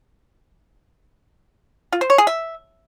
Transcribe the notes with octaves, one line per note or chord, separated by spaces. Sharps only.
F4
C5
C#5
G#4
E5